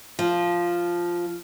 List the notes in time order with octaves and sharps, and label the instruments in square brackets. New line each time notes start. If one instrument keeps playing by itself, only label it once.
[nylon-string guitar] F3